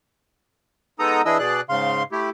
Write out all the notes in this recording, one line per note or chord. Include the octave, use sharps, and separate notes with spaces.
G#3 B3 D#4 A4 A#5 D#6
E3 D4 E4 G#4 D#5 E6
B2 G#4 D5 F#6
G#2 C#3 F5 C6
A3 E4 G4